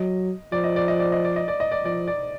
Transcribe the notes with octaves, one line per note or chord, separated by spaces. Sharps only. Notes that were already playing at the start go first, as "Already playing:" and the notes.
Already playing: F#3 D#5
F3 D5
D#5
D5
D#5
D5
D#5
D5
D#5
D5
D#5
D5
F3 D5
D5